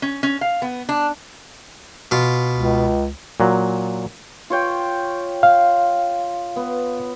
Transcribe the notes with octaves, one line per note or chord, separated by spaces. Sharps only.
C#4
C#4
F5
B3
D4
B2 F4
C#2
A#2 F#3
F4 C#5 G5
F5
B3